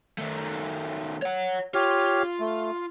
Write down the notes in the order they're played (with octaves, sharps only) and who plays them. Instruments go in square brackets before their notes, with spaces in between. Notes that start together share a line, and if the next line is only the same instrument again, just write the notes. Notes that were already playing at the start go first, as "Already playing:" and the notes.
[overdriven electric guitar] D#3 A3
C#5 F#5
[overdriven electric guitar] F4 [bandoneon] G4 C#5 F6
[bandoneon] A3